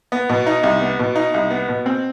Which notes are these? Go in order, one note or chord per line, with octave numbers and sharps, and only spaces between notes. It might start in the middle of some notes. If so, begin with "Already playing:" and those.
B3
B2
D#4
C2
B3
B2
D#4
C2
B3
B2
C4